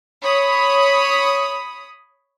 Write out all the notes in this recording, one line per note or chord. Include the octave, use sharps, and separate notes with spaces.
C#5 B5 D#6